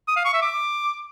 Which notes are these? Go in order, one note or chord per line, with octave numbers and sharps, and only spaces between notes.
D#6
F5
C#6
E5
D6